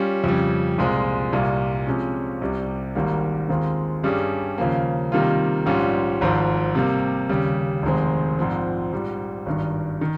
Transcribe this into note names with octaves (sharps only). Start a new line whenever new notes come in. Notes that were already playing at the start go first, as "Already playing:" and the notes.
Already playing: G3 C#4 F4
F2 C#3 G3
C2 A#2 G#3 C4
C2 A#2 G3
C3 F3 G#3 C#4
C2 C3 G3
G#1 G#2 D#3 G3 A#3
D#2 D#3 G#3 C4 F4
G2 G3 C#4 G#4
D#2 C#3 F3 A#3
C3 D#3 G3 A#3 F4
A#1 G#2 G3 C#4 F4
G#1 G#2 F3
C3 G3 A#3
D#2 C#3 G3
F1 D#2 D#3 G#3 C4
A#1 G#2 F3 C4
A#1 G#2 G3
G#1 G2 D#3
D#3